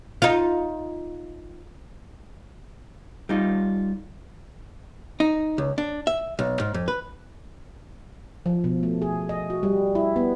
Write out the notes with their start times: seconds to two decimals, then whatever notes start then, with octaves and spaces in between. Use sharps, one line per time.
0.22 D#4 F4
3.29 G3 D#4 F4
5.20 D#4
5.58 C#2
5.78 D4
6.07 E5
6.39 B1
6.60 G#2
6.74 F2
6.88 B4
8.46 F3
8.64 B2
8.83 A3
9.02 G#4
9.29 D#5
9.50 F#4
9.63 G3
9.95 E4
10.16 B3